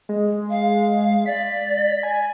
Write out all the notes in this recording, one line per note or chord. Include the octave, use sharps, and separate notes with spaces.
G#3
F5
D5 B6
G#5